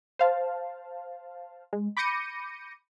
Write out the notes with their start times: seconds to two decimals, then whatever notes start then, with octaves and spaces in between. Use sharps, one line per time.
0.19 C5 F5 A5
1.73 G#3
1.97 B5 D6 G6 A#6 C#7 D#7